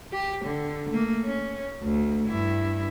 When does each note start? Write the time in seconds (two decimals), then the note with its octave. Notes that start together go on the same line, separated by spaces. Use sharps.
0.12 G4
0.45 D3
0.89 A3 A#3
1.24 C#4
1.83 D2
2.27 G2 E4